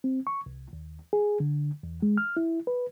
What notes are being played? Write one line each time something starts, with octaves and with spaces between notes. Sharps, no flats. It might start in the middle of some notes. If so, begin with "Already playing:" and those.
C4
C#6
C2
D#2
G#4
D3
E2
G#3
F6
E4
B4